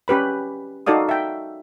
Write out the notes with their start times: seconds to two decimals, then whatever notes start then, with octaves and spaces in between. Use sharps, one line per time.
0.08 C#4 G4 B4 B5
0.87 D#4 F#4 A4 D5 F5 D#6
1.09 E5 G5